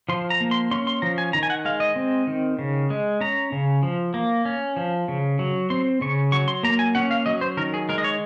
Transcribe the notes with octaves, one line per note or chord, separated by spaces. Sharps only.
F3 C6
A#5
A#3
C6
C#4 C6
C6
F3 A#5
G#5
D#3 A#5
G#5
F#5
G#3 F5
D#5
C4
D#3
C#3
G#3
C#4 A#5
C#3
F3
A#3
C#4
F3
C#3
F#3
C4 C6
C#3 C#6
F#3 C#6
C6
A#3 A#5
G#5
C#4 F#5
F5
F#3 D#5
C5
D#3 A#4
G#4
G#3 A#4
D#5
C#5